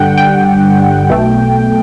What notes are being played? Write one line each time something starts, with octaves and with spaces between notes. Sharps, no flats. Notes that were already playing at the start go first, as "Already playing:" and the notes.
Already playing: G2 D3 G3 F#5 G5
G5
B1 B2 A3